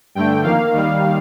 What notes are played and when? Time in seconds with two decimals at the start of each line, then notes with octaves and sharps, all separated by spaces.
0.15 G2 D3 A3 G5
0.43 F2 D#3 A#3 F5
0.73 D#2 D#3 G3